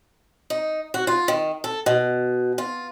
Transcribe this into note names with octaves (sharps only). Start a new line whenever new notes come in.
D#4
F#4
F4
D#3
A4
B2
F4